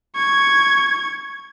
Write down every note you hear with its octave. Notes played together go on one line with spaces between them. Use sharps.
C#6 G#6